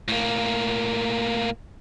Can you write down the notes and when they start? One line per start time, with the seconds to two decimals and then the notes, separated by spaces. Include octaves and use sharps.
0.08 A2 A#3